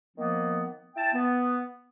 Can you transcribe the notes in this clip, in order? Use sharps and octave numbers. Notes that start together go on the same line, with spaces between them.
D#3 F3 A#3 B3
E4 G5 A5
B3